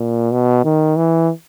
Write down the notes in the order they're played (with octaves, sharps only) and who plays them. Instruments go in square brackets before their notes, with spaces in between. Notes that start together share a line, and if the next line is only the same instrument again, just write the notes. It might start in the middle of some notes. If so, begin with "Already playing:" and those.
Already playing: [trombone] A#2
B2
D#3
E3